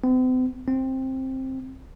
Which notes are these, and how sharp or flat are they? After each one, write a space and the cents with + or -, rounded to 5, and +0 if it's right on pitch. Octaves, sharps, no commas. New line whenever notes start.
C4 -45
C4 +10